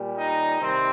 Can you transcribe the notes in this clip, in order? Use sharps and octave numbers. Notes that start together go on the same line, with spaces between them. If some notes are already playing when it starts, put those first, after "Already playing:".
Already playing: A#2 G3
D#4
C3 D#3 G3 C4